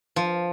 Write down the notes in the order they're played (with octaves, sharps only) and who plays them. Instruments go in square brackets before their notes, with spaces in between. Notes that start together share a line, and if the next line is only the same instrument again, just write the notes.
[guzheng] F3